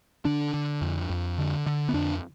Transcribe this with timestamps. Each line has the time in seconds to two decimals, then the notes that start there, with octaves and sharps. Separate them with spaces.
0.25 D3 D4
0.54 D3
0.81 F2
1.10 F2
1.38 D3
1.66 D3
1.89 B3
1.93 F2 D4